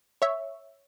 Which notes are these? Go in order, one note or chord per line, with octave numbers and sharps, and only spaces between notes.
C#5 E5